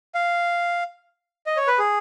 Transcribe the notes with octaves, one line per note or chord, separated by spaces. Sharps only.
F5
D#5
C#5
B4
G#4